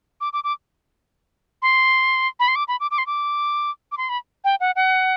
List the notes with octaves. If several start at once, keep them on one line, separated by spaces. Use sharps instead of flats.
D6
D6
D6
C6
B5
C6
D6
B5
D6
D6
C6
D6
D6
C6
B5
G5
F#5
F#5